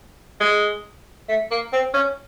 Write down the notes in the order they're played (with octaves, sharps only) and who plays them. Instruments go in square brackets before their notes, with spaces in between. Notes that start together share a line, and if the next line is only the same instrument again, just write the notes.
[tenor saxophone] G#3
A3
A#3
C4
C#4